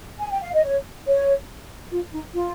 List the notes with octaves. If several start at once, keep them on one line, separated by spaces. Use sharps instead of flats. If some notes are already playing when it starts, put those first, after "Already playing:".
G#5
G5
F5
D#5
C#5
C#5
F4
D#4
F4